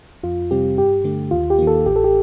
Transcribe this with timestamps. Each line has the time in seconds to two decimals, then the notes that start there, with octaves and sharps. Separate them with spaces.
0.23 F2 F4
0.51 C3 G3 C4 G4
0.78 G2 G4
1.04 D3 A3
1.31 D#2 F4
1.50 G4
1.59 D#3 A#3
1.67 A4
1.86 A1 G4
1.96 A4
2.04 G4